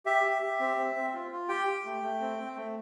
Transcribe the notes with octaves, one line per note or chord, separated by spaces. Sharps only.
G4 E5
G4
G4
C4
C4
C4
F4
F4
G4 G5
G4
A3
A3
C4
C4
A3